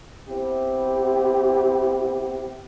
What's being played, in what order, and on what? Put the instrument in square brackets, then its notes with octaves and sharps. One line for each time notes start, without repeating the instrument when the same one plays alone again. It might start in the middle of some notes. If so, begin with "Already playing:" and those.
[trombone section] B3 C4 E4 G4